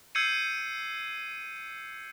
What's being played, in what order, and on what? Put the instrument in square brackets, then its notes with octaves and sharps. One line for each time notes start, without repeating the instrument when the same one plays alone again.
[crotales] E6 G6 G#6 C7 C#7 D#7